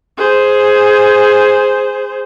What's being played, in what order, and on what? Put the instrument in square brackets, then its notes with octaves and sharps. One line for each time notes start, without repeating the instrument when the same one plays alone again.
[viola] G#4 C5